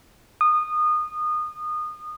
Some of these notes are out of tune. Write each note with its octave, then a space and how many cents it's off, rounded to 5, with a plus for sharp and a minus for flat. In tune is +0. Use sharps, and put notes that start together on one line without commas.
D#6 -25